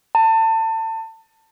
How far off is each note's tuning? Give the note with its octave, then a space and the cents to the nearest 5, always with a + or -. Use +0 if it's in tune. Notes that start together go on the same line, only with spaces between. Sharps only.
A5 +30